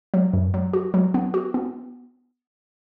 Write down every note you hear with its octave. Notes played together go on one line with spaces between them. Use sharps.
F#3
F#2
F#3
F#4
F#3
B3
F#4
B3